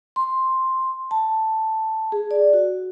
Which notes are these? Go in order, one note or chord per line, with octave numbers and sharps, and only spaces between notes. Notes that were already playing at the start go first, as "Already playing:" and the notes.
C6
A5
G#4
D5
F#4